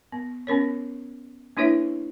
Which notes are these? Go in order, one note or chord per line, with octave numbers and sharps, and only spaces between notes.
B3
B3 C#4 A#4 C#5
A#3 D4 E4 B4 C#5 E5